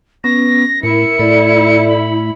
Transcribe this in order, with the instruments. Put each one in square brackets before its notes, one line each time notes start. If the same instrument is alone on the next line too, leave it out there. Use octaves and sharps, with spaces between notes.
[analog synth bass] B3 [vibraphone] C#4 [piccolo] A#6
[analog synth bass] A2 [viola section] E4 [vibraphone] A#4 [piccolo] C#7
[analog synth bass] A2 [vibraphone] A4 D5
[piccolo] B5